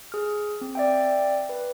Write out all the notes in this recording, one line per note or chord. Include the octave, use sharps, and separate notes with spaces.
G#4 F6
C4
D5 E5 G5
B4